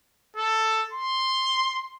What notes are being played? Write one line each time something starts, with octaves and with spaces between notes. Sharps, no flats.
A4
C6